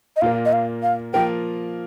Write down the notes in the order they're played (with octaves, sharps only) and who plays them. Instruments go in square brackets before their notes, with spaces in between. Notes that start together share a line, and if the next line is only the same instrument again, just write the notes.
[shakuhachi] D#5
[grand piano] A#2 A#3 F4 A#4 [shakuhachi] F5
[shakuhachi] D#5
F5
F5
[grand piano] F3 A#3 F4 A#4 [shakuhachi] G5